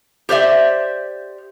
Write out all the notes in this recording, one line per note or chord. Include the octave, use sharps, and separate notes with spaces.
G4 C5 D5 E5